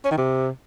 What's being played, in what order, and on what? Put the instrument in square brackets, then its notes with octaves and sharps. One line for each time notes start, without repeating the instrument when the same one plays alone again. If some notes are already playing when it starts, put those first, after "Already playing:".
[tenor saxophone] C#4
D#3
C3